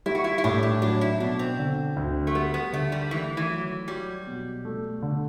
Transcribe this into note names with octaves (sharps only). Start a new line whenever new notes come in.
G3 E4
F#4
E4
E4
A2 D4
D4
F#3 D4
E4
B2 D4
C4
D3
D2
A3
G3 B3
B3
D3 A3
G3
E3 A3
E3
F#3
F#3 G3
B2
A3
D3